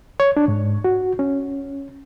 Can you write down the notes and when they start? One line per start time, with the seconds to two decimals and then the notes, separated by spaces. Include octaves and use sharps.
0.20 C#5
0.37 D4
0.48 G#2
0.84 F#4
1.19 C#4